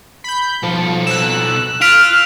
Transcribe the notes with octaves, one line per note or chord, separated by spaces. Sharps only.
B5 G6
B2 F3 A4
E6 F#6 E7
F4 F6 B6 D7 F7